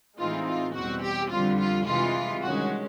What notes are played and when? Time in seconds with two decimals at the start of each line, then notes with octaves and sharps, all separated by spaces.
0.18 A2 E3 G#3 C4 D#4 F4
0.45 F4
0.74 E2 B2 G3 C4 F#4
1.02 G4
1.30 F2 D3 G3 F4
1.58 F4
1.86 C2 C3 E3 G#3 F4
2.42 G2 D#3 G#3 C#4 F#4